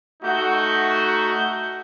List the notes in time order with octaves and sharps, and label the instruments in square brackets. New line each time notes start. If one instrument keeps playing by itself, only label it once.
[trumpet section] A3 D#4 F#4 [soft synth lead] G6